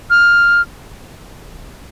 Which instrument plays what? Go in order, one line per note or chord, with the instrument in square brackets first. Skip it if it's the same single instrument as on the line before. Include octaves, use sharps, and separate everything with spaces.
[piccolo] F6